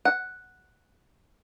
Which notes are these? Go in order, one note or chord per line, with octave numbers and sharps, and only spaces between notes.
F#5